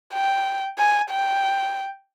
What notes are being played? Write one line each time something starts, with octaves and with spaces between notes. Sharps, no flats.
G5
G#5
G5